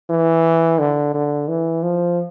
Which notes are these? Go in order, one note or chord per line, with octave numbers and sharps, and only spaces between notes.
E3
D3
D3
E3
F3